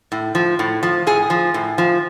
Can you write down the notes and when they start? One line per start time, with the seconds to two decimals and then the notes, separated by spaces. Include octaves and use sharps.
0.12 A2
0.35 F3
0.59 A2
0.83 F3
1.07 A2 G#4
1.30 F3
1.54 A2
1.78 F3